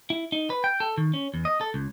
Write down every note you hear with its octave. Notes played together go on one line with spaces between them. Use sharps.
E4
D#4
B4
G5
A4
D#3
C#4
E2
D#5
A4
C#2